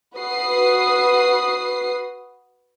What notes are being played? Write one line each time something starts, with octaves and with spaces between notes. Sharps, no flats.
F#4 B4 D#6 C7